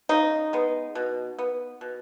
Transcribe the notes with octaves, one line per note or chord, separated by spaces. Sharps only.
C#3 D#4
G#3 B3
B2
B3
B2